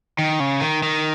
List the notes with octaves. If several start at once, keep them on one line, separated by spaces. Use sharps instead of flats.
D#3
C#3
D#3
D#3